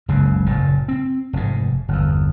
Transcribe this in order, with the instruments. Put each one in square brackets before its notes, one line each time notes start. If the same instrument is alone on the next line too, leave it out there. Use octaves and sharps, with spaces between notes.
[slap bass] F#1 C#2 F#2 C#3
F#1 A#2
C4
F1 G#2
G1 E2